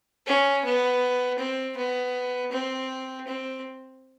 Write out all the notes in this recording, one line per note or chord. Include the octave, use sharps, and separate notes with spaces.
C#4
B3
C4
B3
C4
C4